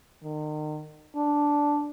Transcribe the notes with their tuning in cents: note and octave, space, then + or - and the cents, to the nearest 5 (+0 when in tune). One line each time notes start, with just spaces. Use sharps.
D#3 -35
D4 -5